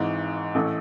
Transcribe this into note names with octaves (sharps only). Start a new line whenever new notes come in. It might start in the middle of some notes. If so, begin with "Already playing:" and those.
Already playing: G#1 G#2 E3
A1 A2 E3 A3